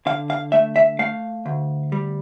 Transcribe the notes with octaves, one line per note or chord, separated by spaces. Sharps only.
D3 F5
F5
A3 E5
E5
A3 F5
D2
G3